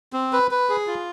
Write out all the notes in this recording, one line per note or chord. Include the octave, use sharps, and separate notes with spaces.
C4
B4
B4
G#4
F4